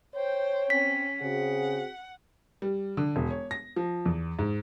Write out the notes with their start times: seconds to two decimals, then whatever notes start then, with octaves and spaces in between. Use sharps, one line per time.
0.15 C5 C#5 G5
0.70 C4 C#4 B6
1.22 C#3 C4 F#4 G#4 F#5
2.62 G3
2.97 D3
3.16 E1
3.31 C#5
3.51 A#6
3.76 F3
4.06 E2
4.39 G#2